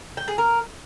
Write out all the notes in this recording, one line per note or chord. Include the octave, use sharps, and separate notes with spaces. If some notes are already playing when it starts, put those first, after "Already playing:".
G5
G#4
A#4